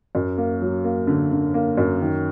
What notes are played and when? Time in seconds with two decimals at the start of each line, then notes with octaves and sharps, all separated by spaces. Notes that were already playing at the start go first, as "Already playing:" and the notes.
0.15 F#2
0.38 A#3
0.62 F#3
0.84 A#3
1.07 D3
1.32 D3
1.54 A#3
1.77 F#2
2.01 D#3